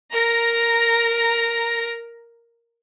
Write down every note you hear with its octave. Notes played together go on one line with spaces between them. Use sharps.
A#4 A#5